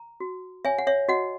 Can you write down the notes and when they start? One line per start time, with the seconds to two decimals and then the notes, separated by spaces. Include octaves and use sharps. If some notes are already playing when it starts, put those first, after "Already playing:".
Already playing: A#5
0.20 F#4
0.65 C#5 E5 G#5
0.78 F#5
0.87 C#5 E5
1.08 F#4 D#5 F#5